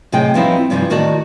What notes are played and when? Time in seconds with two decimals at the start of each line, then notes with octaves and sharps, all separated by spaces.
0.12 A2 C3 F#3 G#4 D#5 G5
0.34 F3 G3 B3 C4 D#4 E4
0.70 G2 C3 E3 F3 G3 D#4
0.90 A2 D#3 F#4 A#4 D5 A5